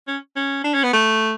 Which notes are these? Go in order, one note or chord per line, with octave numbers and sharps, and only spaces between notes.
C#4
C#4
D4
C#4
B3
A3